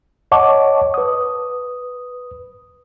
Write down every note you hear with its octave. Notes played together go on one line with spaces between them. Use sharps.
C#5 D#5 F#5 A5 C#6 D6
B4 D#6